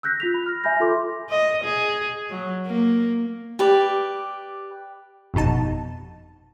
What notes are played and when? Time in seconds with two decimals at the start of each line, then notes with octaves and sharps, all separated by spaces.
0.03 E6 F#6 G6 A#6 B6
0.20 F4 B6 F7
0.34 B5
0.46 F6 A#6
0.64 E5 G#5 B5 G6 A#6
0.80 F4 A4 C6 D6
1.30 D#5
1.65 G#4
2.30 F#3
2.66 A#3
3.59 G4 B4 D5
5.34 G1 F2 B2 D#4 A5